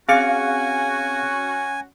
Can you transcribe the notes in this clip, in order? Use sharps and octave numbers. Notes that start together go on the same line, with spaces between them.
C4 C#4 F#4 G#4 F5 G#5 C#7